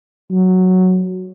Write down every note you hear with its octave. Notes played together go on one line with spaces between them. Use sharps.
F#3